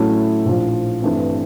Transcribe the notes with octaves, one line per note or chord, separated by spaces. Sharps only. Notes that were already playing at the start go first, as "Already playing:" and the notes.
Already playing: A2 F#3 A3 C#4 E4
A#1 A2 F3
G2 E3 A3 C4